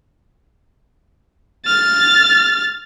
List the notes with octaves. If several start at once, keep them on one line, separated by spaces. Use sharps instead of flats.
F6 A6